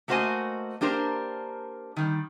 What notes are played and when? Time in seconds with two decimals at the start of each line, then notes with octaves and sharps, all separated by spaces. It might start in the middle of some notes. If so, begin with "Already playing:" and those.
0.08 A3 A#3 F#4 C5 D#5 G#5
0.81 A#3 D4 G4 A#4 C5
1.96 D#3 G3